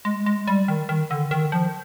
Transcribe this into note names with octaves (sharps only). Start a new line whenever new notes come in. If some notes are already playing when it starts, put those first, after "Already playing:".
G#3
G#3
G3
D#3
D#3
D3
D#3
F3